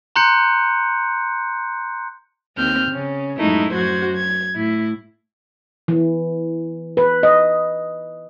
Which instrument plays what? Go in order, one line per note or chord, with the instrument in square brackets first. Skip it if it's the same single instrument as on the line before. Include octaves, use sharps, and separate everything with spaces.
[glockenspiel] A#5 C6 F#6 G6 C#7
[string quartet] D#2 C4 F6 G6
C#3 C#4
F#2 A2 G#3 A3 D#4 E4
F#2 F#3 F#4 C5 G#6
G#6
A2 E4
[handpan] E3
B4
D#5